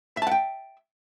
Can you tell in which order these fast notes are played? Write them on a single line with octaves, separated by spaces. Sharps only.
E5 A5 F#5 G5